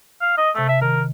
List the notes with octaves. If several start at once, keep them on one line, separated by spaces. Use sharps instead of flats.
F5
D#5
C3 A3 A5 E6
E5
D#3 A#4